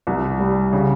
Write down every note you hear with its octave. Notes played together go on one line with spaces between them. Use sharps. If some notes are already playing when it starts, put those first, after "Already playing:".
C2
G3
C#3